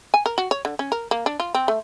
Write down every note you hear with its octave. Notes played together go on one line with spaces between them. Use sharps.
G#5
A#4
F#4
C#5
D3
C#4
A#4
A#3
D4
F4
C4
A3